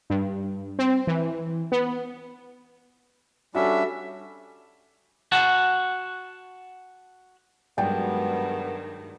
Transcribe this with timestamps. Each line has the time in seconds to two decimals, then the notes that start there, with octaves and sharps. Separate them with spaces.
0.10 G2
0.79 C4
1.07 E3
1.72 B3
3.55 G3 C#4 D4 F#4 A4 E5
5.32 F#4 F#5 A5
7.78 G2 D#3 F#3 G#3 B3 D5 G5